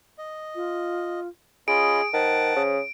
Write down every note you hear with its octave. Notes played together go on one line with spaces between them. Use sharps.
D#5
F4
C#4 F4 G#4 D#5 B5 D7
D#3 C5 F#5 A5
C#3